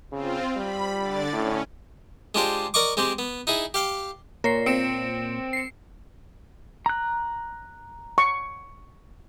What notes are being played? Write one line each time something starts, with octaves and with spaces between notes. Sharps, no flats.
C#3 C4 F4
G3 B5
D3 D5 A6
A2 C#4
G#3 D4 F4 G4 C5
A#4 D5 D#5 C#6 D6
G#3 C4 G4
B3
D#4 E4 G#4
G4 F5 G5
A#2 A#4 C#5 C7
C4 C#7 D7 E7
C7 C#7
A#5 F#6
C#6